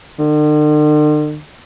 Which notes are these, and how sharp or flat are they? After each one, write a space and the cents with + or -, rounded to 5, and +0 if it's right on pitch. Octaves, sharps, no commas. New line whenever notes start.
D3 +45